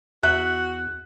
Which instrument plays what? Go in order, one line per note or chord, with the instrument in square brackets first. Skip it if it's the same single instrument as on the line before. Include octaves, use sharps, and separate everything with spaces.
[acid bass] E2 [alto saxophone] F#4 [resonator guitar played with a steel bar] E5 [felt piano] F#6